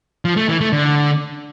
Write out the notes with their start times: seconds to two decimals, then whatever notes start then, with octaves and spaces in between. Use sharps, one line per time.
0.25 F3
0.37 A3
0.49 E3
0.61 A3
0.73 D3